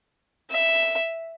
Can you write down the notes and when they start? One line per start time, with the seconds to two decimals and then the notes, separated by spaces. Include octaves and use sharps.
0.51 E5